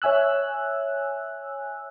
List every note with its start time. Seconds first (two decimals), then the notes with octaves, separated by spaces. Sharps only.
0.02 C#5 E5 G#5 E6 F#6